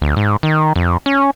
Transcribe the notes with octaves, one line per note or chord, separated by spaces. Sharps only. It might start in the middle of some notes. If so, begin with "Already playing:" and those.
D2
G#2
D#3
F2
C#4